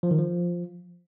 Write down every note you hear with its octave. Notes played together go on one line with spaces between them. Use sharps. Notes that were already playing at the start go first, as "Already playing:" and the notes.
F3
D#3
F3